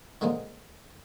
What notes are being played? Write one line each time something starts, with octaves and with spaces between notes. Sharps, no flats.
D3 G#3 A#3 C4 D#4